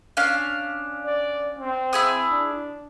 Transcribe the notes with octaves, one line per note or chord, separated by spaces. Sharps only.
C#4 D4 F5
D5
C4
E4 G#4 D#6
D4